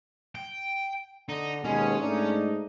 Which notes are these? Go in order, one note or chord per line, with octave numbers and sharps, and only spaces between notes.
G5
D3 D#4
D#2 B2 G#3 C#4 G#4
G#2 A3 D4 D#4